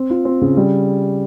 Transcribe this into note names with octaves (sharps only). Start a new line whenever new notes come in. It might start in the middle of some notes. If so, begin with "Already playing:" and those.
Already playing: C4
F4
C4
C#3
G3